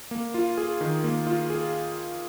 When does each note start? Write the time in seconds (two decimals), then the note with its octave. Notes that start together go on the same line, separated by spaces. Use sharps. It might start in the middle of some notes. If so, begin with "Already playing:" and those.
0.11 A#3
0.34 F4
0.57 G#4
0.81 D#3
1.04 A#3
1.27 F4
1.50 G#4